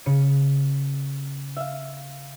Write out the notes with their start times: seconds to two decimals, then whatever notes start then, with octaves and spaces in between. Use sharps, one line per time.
0.06 C#3 C#7 D#7
1.56 E5 F5